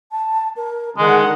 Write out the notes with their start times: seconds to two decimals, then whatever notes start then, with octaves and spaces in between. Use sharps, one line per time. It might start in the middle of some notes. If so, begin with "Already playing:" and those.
0.12 A5
0.57 A#4
0.98 D3 D#3 G#3 G#4 F#5